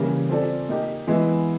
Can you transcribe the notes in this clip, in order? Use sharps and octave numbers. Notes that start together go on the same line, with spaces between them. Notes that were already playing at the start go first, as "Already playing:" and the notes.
Already playing: C#3 E3 G3 A#3 C#4
C4 F4 A4 D5
A#3 D#4 G4
E3 G#3 B3 E4